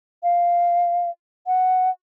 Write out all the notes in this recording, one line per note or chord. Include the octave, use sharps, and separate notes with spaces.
F5
F#5